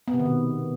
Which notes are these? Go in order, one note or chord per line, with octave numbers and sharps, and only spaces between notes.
B3
C3
D#3
B2